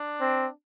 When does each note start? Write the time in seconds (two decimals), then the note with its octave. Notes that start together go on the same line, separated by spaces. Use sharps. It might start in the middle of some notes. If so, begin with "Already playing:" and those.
Already playing: D4
0.21 C4